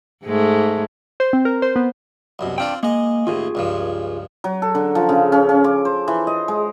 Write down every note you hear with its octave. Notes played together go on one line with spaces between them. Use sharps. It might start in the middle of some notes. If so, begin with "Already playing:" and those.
G#2 G#3 A3
C5
C4
A#4
C5
B3
C2 F#2 B2
C4 D4 F4 D5 G5
G#3 A#3 D#5
D#2 A2 F4 G#4
C#2 G2 F3
F#3
A4
D3
F3
C#3
C#4
C#4
D6
C5
E3
D#5
G#3